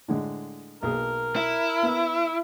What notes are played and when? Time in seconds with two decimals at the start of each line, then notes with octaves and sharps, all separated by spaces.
0.08 A2 D3 G#3
0.83 B1 A#3 G#4 A#4
1.36 E4
1.83 B3